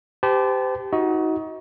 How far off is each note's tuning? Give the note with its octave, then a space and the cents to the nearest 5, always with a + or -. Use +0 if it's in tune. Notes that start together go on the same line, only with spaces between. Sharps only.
G4 +0 C5 -40 A5 -25
D#4 +30 F#4 +0 D#5 +30